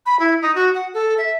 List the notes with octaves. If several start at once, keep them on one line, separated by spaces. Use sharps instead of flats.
B5
E4
D#4
F#4
F#5
A4
E5